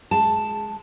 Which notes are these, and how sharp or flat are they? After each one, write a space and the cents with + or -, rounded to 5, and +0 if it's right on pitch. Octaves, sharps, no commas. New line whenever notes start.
G#3 +0 A5 +0